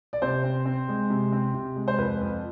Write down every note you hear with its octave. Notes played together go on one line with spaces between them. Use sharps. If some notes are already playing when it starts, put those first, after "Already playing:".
D5
C3 C5
C4
C4
G#3
C3
C4
C3
G#3
C5
F2 B4
F2